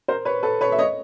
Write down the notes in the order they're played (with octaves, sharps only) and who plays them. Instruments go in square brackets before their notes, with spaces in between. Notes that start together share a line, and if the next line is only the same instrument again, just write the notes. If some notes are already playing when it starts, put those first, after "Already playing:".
[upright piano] A#4 C5
B4 C#5
A4 B4
B4 C#5
E5
C#5 D#5